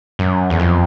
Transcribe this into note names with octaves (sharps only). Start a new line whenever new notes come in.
F#2
E2
F2